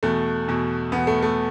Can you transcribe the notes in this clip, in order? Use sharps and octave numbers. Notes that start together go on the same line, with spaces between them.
E2 B2 A3
E2 B2
E2 B2 B3
A3
A3